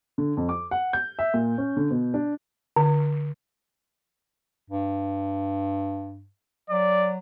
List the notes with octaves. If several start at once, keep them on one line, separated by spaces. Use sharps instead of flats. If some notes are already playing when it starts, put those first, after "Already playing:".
D3
F2
D6
F#5
G6
E5
A#2
C#4
D3
B2
D4
D3
G2
F#3 D5